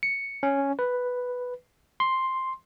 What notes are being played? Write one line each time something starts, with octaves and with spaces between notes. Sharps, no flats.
C#7
C#4
B4
C6